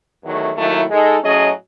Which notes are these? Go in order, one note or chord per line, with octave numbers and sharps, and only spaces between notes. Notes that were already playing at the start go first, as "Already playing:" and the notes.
E2 D#3 F#3 A3
D#2 D#3 F#3 A3 E4
G#3 D#4 A4
A2 F#3 C#4 G#4 D#5